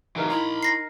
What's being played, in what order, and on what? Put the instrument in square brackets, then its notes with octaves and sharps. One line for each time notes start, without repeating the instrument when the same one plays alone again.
[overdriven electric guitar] E3 F#3 [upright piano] D#4 A#4 F5
[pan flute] E4 [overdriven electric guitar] A#5 B5
[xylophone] A#6 C7